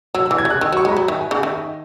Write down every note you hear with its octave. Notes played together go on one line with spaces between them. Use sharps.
F#3 E6
E6
E3
G#6
C#3
F#6
D#3 E6
F#3 C#6
G#3 A#5
B5
F#3
D#3 E5
G#5
C#3 F#5
D#3 E5
D#5